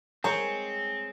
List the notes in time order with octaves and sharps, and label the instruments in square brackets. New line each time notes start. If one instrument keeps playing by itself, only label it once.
[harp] G#3 [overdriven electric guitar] C4 [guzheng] G#4 C#5 [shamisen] C5 A#5